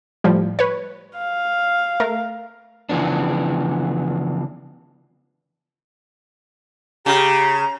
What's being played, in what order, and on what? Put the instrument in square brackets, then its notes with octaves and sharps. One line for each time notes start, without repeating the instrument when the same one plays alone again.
[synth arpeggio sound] A2 F3 G3
B4 C#5
[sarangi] F5
[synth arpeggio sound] A3 A#4
[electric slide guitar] C#3 E3 F3 B3 D4
[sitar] C#3 [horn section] G4 [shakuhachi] A#5